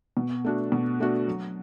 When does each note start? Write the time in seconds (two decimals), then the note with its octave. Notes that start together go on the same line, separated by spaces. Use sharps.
0.17 B2
0.45 A3 D4 F#4
0.72 B2
1.00 A3 D4 F#4
1.27 F#3